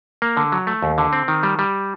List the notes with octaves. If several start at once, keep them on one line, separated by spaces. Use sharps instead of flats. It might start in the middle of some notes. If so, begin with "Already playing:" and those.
A#3
D3
F#3
A3
D#2
D3
C4
D#3
G3
G3